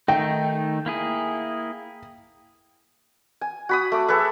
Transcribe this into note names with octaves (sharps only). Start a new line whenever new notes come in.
D#3 A3 D#4 G5
A#3 E4 G#4
G#5
F#4 B5 D#6
A3 D6
G#4 A4 B4 E5